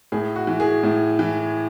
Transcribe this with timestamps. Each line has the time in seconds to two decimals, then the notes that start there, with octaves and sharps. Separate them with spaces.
0.12 A2 G#4
0.36 F#4
0.47 E3
0.60 G#4
0.83 A2
1.19 E3